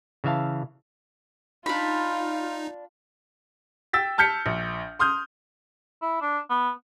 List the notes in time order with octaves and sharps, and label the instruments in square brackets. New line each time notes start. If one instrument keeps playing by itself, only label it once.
[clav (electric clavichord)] C#3 E3 E5 F5 A5
[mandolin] D4 B5 [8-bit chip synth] D#4 [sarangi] F4
[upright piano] G5 E6 A6 B6
A5 F6 G6 B6 C#7
A#1
C6 D#6 F6 G6
[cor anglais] E4
D4
B3